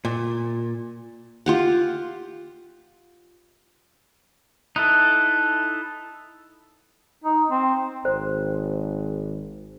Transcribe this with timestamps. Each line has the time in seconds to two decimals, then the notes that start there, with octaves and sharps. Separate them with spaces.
0.05 A#2
1.46 F4 G4 F#5
4.76 D#4 E4 A4 F#6
7.24 D#4
7.50 C4
8.05 G#1 C5